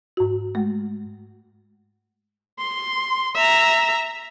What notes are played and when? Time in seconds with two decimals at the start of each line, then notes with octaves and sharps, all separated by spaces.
0.17 G#2 F#4
0.55 G#3 A3
2.59 C6
3.34 E5 A#5